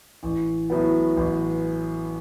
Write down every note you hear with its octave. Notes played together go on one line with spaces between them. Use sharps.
A1
A2 F#3 B3
A1